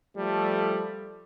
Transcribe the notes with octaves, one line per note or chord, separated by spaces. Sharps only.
F3 G3 A3 A4